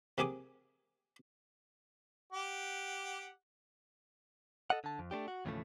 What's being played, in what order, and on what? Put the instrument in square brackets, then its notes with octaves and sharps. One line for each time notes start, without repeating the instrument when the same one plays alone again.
[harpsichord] C3 A#3 G4 G#4 D6 D#6
[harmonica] G4 F#5
[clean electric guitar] A4 D#5 F#5
D3 A5
F2
A3 C4 D4 G4
F#4
D#2 A2 C#3 E3 F3 A3